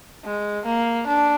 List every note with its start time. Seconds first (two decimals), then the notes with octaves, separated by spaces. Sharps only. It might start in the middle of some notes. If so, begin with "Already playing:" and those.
0.24 G#3
0.65 A#3
1.07 D4